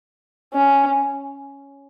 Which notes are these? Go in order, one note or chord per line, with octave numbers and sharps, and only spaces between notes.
C#4